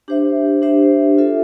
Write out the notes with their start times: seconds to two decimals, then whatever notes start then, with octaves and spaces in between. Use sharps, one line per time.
0.08 D4 G4 C5 E5
0.62 D4 G4 C5 E5
1.18 F4 A4 E5